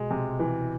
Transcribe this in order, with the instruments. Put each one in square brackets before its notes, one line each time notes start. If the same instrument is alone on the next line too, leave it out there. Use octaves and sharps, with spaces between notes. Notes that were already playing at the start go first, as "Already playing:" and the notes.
Already playing: [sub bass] B2 [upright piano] G#3
[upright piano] C3
E3